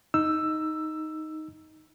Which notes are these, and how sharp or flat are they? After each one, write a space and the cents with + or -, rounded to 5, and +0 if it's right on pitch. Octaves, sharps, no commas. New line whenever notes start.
D#4 +5 E6 +10